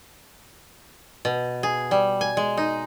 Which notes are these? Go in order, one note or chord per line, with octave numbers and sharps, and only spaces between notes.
B2
G#4
G3
G#5
G#3
D#4